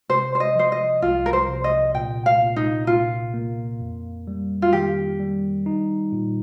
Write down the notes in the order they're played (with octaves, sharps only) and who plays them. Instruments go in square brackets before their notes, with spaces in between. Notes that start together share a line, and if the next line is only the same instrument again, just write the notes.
[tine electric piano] C3 [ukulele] C5
[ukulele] C5
D#5
[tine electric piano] F3 [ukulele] C5
[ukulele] D#5
[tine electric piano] C2 [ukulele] F4
[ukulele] A#4
C5
[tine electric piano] C3
[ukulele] D#5
[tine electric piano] A#2 [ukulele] G5
[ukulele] F5
[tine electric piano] A#2
[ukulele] D#4
[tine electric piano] A#2 [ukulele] F4
[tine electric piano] A#3
F2
G3
[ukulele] F4
[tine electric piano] D#3 [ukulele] G4
[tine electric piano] G3
D#4
A#2